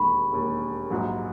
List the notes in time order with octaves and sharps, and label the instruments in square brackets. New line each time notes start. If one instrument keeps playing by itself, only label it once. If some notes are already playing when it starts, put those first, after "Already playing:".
Already playing: [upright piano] E1 D#2 D#3 [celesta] B5 C#6
[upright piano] E1 D#2 D#3
A#1 G#2 F#3